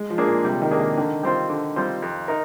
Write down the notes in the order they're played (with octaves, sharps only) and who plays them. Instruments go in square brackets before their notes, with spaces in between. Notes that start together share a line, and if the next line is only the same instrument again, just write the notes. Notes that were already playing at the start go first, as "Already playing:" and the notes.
Already playing: [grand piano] G#3
F3
[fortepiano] A#3 D4 G#4
[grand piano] A#2
[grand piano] C3 [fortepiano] G3
[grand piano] D#3
[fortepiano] A#3 D4 G#4
[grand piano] D#3
[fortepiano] D3 [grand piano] D#3
[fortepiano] G3 C4 F4 C5
D3
G3 C4 F4 C5
F2
D#4 A#4